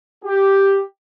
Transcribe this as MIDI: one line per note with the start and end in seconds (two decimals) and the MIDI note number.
0.25 0.81 67